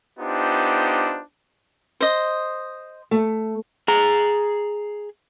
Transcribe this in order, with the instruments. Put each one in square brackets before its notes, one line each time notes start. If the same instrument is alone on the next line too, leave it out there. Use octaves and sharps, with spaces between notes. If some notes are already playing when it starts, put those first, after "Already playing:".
[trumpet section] B3 D4 D#4 F4 G4 C5
[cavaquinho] C5 D#5
[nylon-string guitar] A3
[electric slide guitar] G#4 A#5